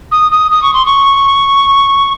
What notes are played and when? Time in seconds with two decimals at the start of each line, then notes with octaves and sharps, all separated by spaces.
0.12 D#6
0.32 D#6
0.51 D#6
0.63 C#6
0.74 C6
0.86 C#6